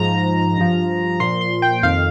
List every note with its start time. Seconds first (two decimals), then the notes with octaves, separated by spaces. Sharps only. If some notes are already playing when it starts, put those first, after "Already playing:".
Already playing: G#2 F3 A#5
0.57 G2 F3
1.20 A#2 F3 C6
1.41 C6
1.62 G5
1.83 F2 D#3 F5